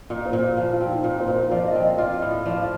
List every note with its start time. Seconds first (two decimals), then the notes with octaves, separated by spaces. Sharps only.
0.10 A#2 D5
0.25 C5
0.33 A#2
0.57 F3
0.73 F4
0.81 C4
0.88 D#4
1.04 A#2
1.20 C5
1.28 A#2
1.35 A#4
1.51 F3 D5
1.67 D#5
1.75 C4
1.82 D#5
1.98 F4 D5
2.22 A2
2.46 F3 D5